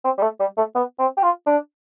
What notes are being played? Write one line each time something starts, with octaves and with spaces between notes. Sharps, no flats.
C4
G3
A3
G3
A3
B3
C4
G4
F4
D4